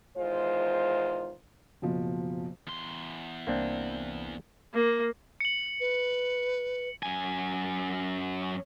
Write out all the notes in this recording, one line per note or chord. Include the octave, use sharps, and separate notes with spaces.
E2 D#3 G#3 F4 C5
F#1 B2 F3
E2 C6
C2 A#3 C4 D4
A#3
C#7 F#7
B4
F#2 G#5